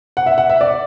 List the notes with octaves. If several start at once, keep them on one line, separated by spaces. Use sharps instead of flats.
F#5
E5
F#5
E5
D5